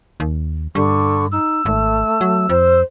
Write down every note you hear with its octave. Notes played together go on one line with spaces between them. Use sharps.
D#2
G2 D3 C#6
D#4 E6
G#1 A3
F#3
F2 C5